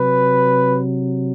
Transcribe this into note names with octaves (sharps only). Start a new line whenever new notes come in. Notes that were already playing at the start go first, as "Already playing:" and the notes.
Already playing: C3 F#3 B4